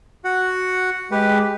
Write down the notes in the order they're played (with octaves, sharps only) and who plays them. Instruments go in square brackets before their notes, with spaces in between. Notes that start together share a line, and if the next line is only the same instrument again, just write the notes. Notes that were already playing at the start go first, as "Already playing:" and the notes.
[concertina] F#4 F#5
[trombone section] G#3 [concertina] G4 B4